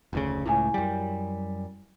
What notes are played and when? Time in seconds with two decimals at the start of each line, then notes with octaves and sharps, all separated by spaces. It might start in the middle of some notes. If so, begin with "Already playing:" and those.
0.13 F1 D2 C#3
0.46 C#2 A2 E4 G#5
0.74 F#2 G3